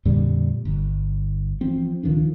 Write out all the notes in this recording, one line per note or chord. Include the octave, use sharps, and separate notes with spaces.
F2 A#2 D3 G3
G1
E3 F3 C4
C#2 D#3 F3 D4